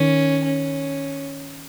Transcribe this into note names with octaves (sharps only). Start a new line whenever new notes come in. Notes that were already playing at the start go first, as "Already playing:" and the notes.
Already playing: D#3 C#4
C#4